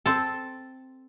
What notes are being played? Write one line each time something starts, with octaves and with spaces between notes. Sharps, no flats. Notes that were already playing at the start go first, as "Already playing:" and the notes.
C4 A4